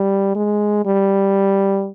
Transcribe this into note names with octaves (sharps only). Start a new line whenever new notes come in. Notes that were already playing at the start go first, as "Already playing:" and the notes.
Already playing: G3
G#3
G3